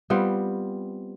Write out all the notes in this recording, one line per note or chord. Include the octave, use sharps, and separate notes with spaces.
G3 B3 C4 F4